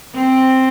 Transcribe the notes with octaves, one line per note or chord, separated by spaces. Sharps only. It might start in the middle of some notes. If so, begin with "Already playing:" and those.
C4